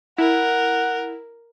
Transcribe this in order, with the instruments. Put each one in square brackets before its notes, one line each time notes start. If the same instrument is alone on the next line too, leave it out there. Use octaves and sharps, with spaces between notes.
[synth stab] E4 [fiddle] A#4 [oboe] F#5